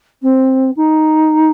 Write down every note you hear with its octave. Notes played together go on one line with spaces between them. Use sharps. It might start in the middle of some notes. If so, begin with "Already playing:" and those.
C4
D#4